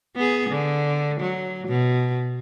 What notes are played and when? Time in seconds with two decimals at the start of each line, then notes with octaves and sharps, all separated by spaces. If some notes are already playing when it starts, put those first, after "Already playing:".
0.16 B3 G#4
0.50 D3
1.21 F#3
1.68 B2